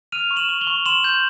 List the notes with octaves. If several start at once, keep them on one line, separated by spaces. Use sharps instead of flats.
F6 D#7 F7
C#6
E7 F#7
C#6
F7 G7
C#6
C6 E7 F#7
G6